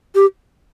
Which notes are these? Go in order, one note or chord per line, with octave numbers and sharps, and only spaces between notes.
G4